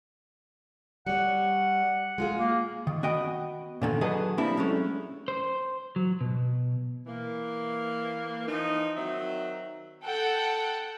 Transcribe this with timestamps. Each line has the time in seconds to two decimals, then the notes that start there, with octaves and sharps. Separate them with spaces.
1.07 G3 C#5 F#5
2.18 G#3 F4 G#4
2.37 A#3
2.87 D#3
3.03 B3 F#4 D#5 G5
3.82 A#2 D3 D#3
4.01 F#3 G#4 A4 B4 D#5
4.38 F3 G3 A#3 C4 D4 E4
4.57 F#3 G#3 A3 C#4
5.28 C5
5.96 F#3
6.21 B2
7.07 E3 A#3
8.47 E3 F3 D#4
8.96 D#3 F#3 C4 E5
10.04 A4 F#5 G5